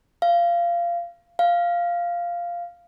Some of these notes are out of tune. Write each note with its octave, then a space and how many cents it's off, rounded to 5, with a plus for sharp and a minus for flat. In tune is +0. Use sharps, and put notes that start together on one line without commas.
F5 -20
F5 -5